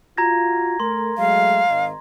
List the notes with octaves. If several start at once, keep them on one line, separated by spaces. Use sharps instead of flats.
F4 F#4 A#5 G#6 A#6
A3 A#4 C6
F#3 G#3 A3 F5
G#1 D#5